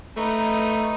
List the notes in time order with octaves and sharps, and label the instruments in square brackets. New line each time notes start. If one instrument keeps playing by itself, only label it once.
[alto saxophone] A3 [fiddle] D#4 B4